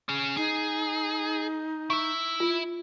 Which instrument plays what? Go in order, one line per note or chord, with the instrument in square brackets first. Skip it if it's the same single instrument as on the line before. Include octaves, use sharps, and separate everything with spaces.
[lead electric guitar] C#4 G#4
[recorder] D#4 [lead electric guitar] G#4
[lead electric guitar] E4 E5 [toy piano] C#6
[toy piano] F4